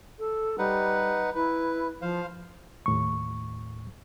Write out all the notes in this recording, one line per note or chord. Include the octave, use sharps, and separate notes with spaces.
A4
G3 D#4 B4 F#5
E4 B4
F3 C5 F5
D#2 A2 C#6